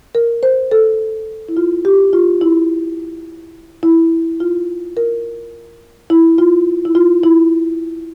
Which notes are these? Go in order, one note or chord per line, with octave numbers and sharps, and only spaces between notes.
A#4
C5
A4
E4
F4
G4
F4
E4
E4
F4
A#4
E4
F4
E4
F4
E4